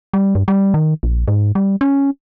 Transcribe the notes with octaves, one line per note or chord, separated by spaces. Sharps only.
G3
G2
G3
D#3
A#1
G#2
G3
C#4